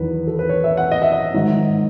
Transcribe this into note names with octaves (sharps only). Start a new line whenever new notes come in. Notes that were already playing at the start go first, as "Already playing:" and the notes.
Already playing: E2 D#3 F#3 B4
A4
B4
C#5
E5
F#5
D#5
E5
D#5
G#2 D#3 F#3